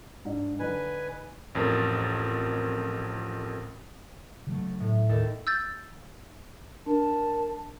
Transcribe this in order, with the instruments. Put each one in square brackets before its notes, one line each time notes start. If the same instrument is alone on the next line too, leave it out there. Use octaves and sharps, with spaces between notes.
[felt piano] G#2 D4
[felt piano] D3 D4 D#4 [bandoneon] B4 G#5
[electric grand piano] A1 F2 A#4 D#6 A6
[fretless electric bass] C#3 F#3 A3
[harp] A2
D#2 A4
[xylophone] E6 G6 A6
[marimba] D4 [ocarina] A#4 [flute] A5